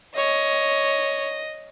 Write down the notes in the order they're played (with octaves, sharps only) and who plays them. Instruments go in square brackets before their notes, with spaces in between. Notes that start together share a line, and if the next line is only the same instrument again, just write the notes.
[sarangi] C#5 [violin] D#5